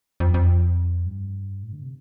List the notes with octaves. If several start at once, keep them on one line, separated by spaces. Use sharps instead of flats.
F2
F2
G2
A2
D3
C3